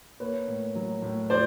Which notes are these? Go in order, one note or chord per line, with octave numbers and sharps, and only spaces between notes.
A#3 B4 C#5
A2
F#3
A2
F3 C5 D5